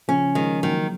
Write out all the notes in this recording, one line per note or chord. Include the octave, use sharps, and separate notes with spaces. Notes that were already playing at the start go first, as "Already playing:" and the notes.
C#3 F3 C#4
D#3 F3 G#3
D#3 F#3 A#3